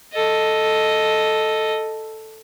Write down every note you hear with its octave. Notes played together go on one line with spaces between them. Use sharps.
A4 D#5